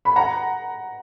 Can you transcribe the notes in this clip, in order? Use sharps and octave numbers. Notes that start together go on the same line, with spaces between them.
B5
F#5 A#5